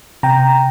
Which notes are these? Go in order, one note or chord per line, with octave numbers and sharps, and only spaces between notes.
C3 G5 A#5